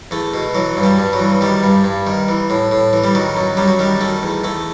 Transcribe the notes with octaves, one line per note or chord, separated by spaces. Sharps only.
E2 A3
B2
E3 F#3
G2
G3
G2
F#3
E3
D#3 G3
G2
G2
D#3
E3
A2
A2
E3
G3
D#3 F#3
F#2
F#2 G3
F#3
D#3 G3
D#3 A3
E2
E2 A3